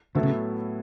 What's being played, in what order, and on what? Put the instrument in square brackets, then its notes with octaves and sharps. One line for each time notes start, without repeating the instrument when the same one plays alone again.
[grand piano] A2 F#3 B3 E4 A4 [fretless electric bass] D3
[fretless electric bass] C#3